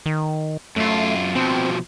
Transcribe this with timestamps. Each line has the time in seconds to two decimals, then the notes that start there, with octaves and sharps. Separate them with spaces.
0.06 D#3
0.76 F#2 A3 F4
1.35 B2 F3 C4